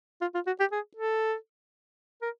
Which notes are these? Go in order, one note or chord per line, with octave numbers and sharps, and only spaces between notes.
F4
F4
F#4
G4
G#4
A4
A#4